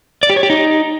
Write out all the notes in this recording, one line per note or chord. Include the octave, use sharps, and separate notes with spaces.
D5
G4
C#5
G4
D#4